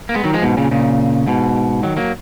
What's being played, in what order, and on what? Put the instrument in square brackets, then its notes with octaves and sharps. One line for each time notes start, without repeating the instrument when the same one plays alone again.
[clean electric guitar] A#3
G#3 B3
D#3 F#3
F3 G#3
G#2 B2
A#2 C#3
A#2 C#3
G#2 B2
D#3 F#3
F#3 A#3